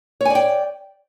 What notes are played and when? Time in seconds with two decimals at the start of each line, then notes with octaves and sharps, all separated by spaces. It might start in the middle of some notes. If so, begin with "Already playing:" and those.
0.21 C#5
0.25 G#5
0.30 D5
0.35 G5